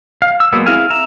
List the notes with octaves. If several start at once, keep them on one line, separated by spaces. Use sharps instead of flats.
F5
E6
F#3 G#3 A#3 B3
C4 E4 G#4 F5 G#5
E5 A#5